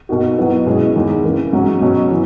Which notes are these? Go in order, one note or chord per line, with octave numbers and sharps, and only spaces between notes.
B2 A#3 D#4 F#4
B2 F#3 B3 E4
B2 G#3 C#4 E4 G#4
E2 D#3 G#3 D#4
C#3 E3 A#3
G#2 F#3 C#4 F#4
B2 F#3 C#4
E3